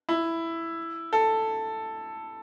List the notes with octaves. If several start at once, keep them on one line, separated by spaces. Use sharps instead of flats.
E4
A4